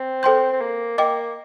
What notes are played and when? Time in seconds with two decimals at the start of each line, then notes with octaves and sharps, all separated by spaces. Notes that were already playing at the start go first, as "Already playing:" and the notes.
Already playing: C4
0.23 A4 C5 G5 C6 G6
0.52 C4
0.61 A#3
0.98 A#3 D#5 G5 D6